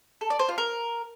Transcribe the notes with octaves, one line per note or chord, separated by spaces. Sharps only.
A4
D5
C5
F4
A#4